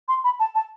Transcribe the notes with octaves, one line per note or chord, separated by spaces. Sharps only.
C6
B5
A5
A5